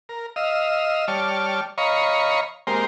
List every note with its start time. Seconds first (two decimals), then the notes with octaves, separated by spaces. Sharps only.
0.09 A#4
0.36 D#5 F5 E6
1.08 G3 C#5 D5 A5 F6
1.78 C#5 D#5 F5 A#5 B5 C#6
2.67 G#3 A#3 C4 G4 A#4 C5